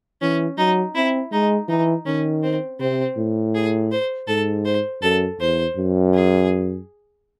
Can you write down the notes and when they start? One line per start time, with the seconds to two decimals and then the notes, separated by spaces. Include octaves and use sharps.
0.22 E3 C#4
0.58 F#3 D#4
0.95 C4 E4
1.32 G#3 D#4
1.68 E3 D#4
2.06 D#3 C#4
2.43 C4
2.80 C3 C4
3.17 A2
3.55 G#4
3.92 C5
4.28 G#2 A4
4.65 C5
5.02 F#2 A4
5.40 E2 C5
5.77 F#2
6.14 G#4